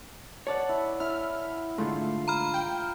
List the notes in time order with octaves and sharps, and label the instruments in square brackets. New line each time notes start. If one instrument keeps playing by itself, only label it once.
[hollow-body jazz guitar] C#5 D5 [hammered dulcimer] F#5 A5
[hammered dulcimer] E4
[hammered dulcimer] E4 [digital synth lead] F6
[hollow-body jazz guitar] G#2 D3 [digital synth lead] A3 [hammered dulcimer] F4
[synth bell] A#5 B5 F6
[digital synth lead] G5